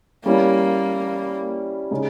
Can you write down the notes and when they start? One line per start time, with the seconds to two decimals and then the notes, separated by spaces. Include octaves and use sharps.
0.25 G3 A#3 C#4 E4
1.91 C#3 G#3 D#4